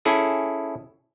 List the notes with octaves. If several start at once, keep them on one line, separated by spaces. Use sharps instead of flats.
C#4 E4 G#4 A4